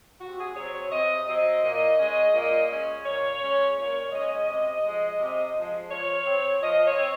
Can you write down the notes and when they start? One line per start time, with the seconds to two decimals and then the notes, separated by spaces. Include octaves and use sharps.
0.21 C3 F#4
0.39 G#4
0.56 F#3 C4 C#5
0.74 C#5
0.91 C3 D#5
1.27 F#3 C4 D#5
1.63 A#2
1.99 G#3 C#4
2.34 A#2
2.70 G#3 C#4
3.05 A#2 C#5
3.41 G#3 C#4
3.77 A#2 C#5
4.12 G#3 C#4 D#5
4.48 C3
4.84 F3 G#3
5.19 C3
5.55 F3 G#3
5.90 F3 C#5
6.26 C4
6.62 F3 D#5
6.86 C#5
6.97 C4